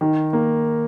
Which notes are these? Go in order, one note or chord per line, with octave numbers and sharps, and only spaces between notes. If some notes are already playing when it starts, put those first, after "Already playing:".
D#3
A#3